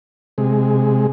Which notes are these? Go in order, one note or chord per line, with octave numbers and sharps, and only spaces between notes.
C3 G#3